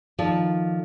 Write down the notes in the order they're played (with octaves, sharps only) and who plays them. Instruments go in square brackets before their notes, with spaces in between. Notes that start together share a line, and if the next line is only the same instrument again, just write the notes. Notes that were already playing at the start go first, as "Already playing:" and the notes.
[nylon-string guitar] D#3 F3 A4 D5